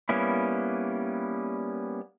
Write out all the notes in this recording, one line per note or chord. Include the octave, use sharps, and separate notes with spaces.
G3 A#3 B3 C#4 E4